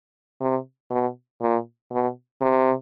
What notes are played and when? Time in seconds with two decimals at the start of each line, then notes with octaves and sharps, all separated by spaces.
0.41 C3
0.91 B2
1.42 A#2
1.92 B2
2.41 C3